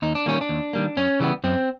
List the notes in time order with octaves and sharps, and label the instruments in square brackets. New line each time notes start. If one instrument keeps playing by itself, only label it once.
[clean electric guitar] D#2 D#4
D4
D#3 G3 A#3 C#4
D4
D#2
D#3 G3 A#3
F#2 C#4
C#3 E3 G3 B3
F#2 C4